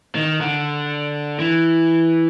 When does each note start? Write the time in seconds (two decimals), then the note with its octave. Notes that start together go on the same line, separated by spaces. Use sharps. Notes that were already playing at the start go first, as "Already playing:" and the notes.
0.15 D#3
0.41 D3
1.39 E3